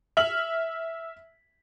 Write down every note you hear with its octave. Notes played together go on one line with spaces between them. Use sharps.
E5 F6 F#7